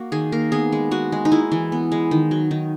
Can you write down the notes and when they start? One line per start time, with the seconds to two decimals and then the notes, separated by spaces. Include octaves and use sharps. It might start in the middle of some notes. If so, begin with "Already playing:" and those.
Already playing: A#3 F#4
0.12 D#3 G#4
0.32 A#3 A#4
0.52 B3 G#4
0.72 G#3
0.91 G#3 F#4
1.12 G#3
1.25 D#4
1.32 G#3 E4
1.52 E3
1.72 B3
1.92 G#3
2.11 D#3
2.31 F#3
2.51 D#3